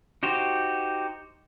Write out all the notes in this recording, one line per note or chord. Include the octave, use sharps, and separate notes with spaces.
D#4 F#4 G4 C5